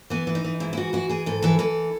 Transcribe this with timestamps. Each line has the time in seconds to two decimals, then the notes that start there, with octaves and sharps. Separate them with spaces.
0.10 E3 B3
0.27 E3
0.35 D#4
0.44 E3
0.60 G#2 E4
0.73 E4
0.77 E3 F#4
0.93 E3 F#4
1.09 E3 G#4
1.26 G#2 A4
1.42 E3 A4
1.59 E3 A4